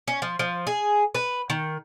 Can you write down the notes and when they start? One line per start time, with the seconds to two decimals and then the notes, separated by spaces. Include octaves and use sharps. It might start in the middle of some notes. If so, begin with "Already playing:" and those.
0.08 C#4
0.22 F3
0.39 F3
0.67 G#4
1.15 B4
1.50 D#3